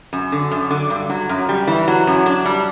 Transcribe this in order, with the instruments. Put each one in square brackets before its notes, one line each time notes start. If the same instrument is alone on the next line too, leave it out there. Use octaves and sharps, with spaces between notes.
[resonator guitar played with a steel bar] F#2
D3
F#2
D3
G2
F#3
F#2
G3
E3
F#3
F#2
D4
G3